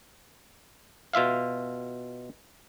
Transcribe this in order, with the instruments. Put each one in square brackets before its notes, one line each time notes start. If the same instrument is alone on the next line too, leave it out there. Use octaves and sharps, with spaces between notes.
[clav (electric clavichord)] B2 F4 E5 F5